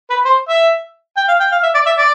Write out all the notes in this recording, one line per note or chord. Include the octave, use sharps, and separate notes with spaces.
B4
C5
E5
G5
F5
G5
F5
E5
D5
E5
D5